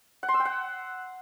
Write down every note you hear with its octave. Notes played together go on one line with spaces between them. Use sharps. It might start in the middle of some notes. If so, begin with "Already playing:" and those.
F#5
C6
E6
G5
F#5